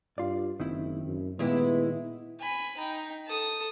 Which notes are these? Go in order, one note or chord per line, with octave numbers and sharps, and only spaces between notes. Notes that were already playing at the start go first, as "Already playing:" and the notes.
G2 F4 D5
F#1 D#3 C4 E4
F#2
A#2 D#3 G#3 B3 E4 G4
G#5 B5
D#4 G5
A4 D#6